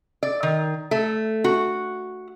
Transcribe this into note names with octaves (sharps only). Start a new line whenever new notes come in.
D5
D#3
A3
F#4